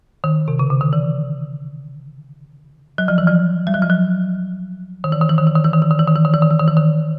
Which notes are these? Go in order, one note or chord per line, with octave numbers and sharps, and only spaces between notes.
D#3
C3
C#3
D3
D#3
E3
F#3
F3
E3
F3
G3
F#3
F3
F#3
D#3
E3
D#3
E3
D#3
E3
D#3
E3
D#3
E3
D#3
E3
D#3
E3
D#3
E3
D#3
E3
D#3
E3
D#3